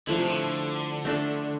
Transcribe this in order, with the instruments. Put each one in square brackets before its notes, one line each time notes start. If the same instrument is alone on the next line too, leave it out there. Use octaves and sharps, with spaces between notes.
[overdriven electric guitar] D3 [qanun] F3 A3 E4
[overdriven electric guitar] C3
D3
[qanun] A3 D4 A4